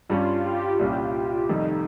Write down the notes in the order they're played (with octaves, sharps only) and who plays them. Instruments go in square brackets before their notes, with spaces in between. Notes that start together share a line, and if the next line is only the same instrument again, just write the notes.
[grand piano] G2 G3 C#4 [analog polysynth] F4
[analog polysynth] F4
G4
[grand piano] C2 A#2 G3 C#4
[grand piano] F1 F2 D#3 G3 [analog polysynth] D#4